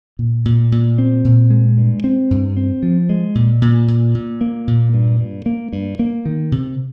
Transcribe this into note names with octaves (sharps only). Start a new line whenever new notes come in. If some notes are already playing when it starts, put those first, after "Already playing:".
A#2
A#2
A#2
C4
A#2
G#3
G2
C4
G2
C4
F3
G#3
A#2
A#2
A#2
A#2
A#3
A#2
G2
G2
A#3
G2
A#3
D#3
C3